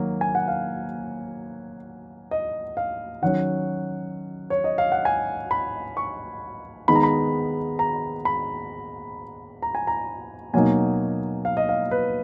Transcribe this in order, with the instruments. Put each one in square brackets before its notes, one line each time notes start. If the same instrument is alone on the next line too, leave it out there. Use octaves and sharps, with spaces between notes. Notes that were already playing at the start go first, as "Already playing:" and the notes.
Already playing: [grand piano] D#3 F#3 A#3
G#5
F#5
F5
D#5
F5
D#3 F#3 C#4 F#5
C#5
D#5
F5
F#5
G#5
B5
C#6
D#3 G#3 B3 D#4 B5
A#5
B5
A#5
B5
A#5
G#5
A#5
B2 F#3 A#3 D#4 G#5
F5
D#5
F5
B4